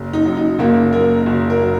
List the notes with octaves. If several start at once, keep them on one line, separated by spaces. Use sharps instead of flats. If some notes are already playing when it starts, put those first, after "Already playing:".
Already playing: F#1
D#4
F#2 F#3
D#4
F#1 A#3
F#2 F#3 A#4
F#1
A#4
F#3